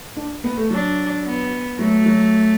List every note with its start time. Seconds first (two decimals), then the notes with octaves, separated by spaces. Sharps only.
0.17 D4
0.44 B3
0.57 A3
0.70 F#3 D4
1.25 B3
1.79 F#3 A3
2.06 F#3